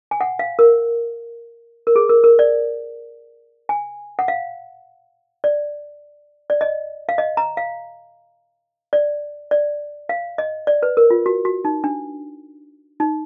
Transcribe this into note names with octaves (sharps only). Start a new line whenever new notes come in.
G#5
F#5
F5
A#4
A#4
G#4
A#4
A#4
D5
G#5
F#5
F5
D5
D5
D#5
F5
D#5
A#5
F5
D5
D5
F5
D#5
D5
B4
A#4
F4
F#4
F#4
D#4
D4
D#4